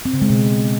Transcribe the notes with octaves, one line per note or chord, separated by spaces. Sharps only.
C4
C#3
G#3
B2